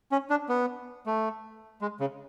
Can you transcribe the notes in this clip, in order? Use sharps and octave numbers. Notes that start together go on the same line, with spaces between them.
C#4
D4
B3
A3
G#3
C#3